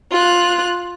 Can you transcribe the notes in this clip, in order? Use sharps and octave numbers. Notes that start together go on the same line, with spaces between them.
F4 F#6